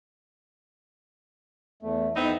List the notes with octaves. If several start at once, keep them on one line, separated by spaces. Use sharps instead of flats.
E2 A3
F2 B3 C4 D#4 E4